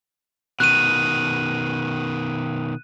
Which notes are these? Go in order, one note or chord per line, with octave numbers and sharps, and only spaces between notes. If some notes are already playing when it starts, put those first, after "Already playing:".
B2 D#3 F#6 D#7